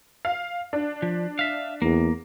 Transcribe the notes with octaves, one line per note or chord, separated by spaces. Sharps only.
F5
D4
F3
E5 F5
E2 A#3